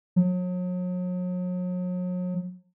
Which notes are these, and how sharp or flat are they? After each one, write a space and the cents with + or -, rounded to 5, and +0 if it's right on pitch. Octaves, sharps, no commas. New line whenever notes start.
F#3 -40